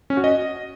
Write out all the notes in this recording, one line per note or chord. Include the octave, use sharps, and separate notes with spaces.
C#4
F#4
D#5